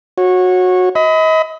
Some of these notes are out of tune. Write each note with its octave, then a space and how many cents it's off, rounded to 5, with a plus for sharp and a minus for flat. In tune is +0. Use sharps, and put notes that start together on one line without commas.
F#4 -20 C#5 -20
D#5 +35 B5 +25